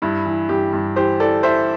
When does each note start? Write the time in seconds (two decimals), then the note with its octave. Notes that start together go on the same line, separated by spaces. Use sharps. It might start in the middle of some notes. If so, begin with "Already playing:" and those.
0.02 G2 E4
0.26 E3
0.49 G2 G4
0.73 G2
0.96 E3 G4 C5
1.20 E3 A4 D5
1.43 E3 C5 E5